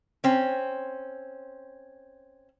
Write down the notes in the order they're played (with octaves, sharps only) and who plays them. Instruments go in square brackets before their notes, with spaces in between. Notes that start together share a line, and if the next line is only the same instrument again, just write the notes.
[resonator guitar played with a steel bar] C4 C#4